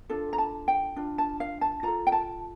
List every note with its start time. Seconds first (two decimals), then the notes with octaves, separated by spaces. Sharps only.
0.10 D4 F4 A4
0.33 A#5
0.38 A5
0.68 G5
0.96 D4 F4
1.18 A5
1.40 F5
1.61 A5
1.83 F4 A4 A#5
2.07 G5
2.12 A5